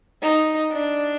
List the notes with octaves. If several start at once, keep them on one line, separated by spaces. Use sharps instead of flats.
D#4
D4